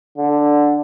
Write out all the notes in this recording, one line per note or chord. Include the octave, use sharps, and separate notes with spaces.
D3